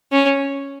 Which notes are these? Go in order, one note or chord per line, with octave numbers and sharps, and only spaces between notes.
C#4